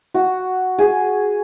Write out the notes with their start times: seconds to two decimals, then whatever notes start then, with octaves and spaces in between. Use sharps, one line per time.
0.14 F#4
0.78 G#4